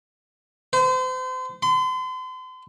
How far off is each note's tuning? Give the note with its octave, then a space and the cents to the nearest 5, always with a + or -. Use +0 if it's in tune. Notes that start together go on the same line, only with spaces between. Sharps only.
C5 -35
C6 -40